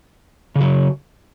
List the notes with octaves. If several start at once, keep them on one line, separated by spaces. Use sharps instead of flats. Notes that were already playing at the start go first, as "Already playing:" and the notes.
C#3 F#3